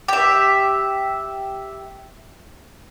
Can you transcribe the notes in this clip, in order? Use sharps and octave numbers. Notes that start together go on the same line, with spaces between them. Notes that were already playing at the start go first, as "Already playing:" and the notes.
G4 E5